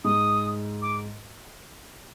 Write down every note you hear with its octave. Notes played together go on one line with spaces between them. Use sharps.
G#2 G#3 D#6
D6